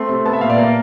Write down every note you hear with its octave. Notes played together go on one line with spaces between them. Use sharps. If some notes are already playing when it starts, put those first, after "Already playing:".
Already playing: A3 C4 C6
C3
B3 A5
E5
A#2 F5
D5
A#3